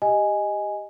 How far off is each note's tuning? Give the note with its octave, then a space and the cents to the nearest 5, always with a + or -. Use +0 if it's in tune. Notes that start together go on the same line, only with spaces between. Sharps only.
G4 +0 D#5 +0 G#5 +0